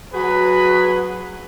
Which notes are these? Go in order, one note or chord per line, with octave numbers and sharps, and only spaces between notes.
F#3 F#4 G#4 B4